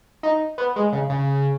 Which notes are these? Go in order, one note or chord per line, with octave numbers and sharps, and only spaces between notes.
D#4
B3
G#3
C#3
C#3